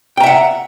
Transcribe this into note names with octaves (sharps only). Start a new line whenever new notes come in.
E5 F#5 G5 A#5